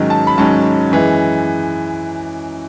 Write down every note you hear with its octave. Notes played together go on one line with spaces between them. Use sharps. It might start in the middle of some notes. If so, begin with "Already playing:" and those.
Already playing: G#2 D#3 F#3 C#4
A5
B5
G#2 D#3 F#3 C#4 A5
F#2 E3 G#3